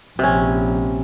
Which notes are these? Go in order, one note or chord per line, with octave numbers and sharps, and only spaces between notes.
A#1 C3 C#4